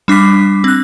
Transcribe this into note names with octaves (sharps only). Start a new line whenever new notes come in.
G3 D4 D6 B6
C4 F#6